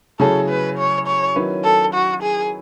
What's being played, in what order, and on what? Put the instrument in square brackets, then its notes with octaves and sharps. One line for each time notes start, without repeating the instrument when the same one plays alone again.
[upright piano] C#3 F#3 C#4 E4 G#4 [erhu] A4
[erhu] B4
C#5
C#5
[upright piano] D#3 F#3 C#4 E4 B4
[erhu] A4
F#4
G#4